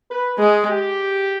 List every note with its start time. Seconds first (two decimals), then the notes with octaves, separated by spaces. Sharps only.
0.10 B4
0.39 G#3 G#4
0.68 G4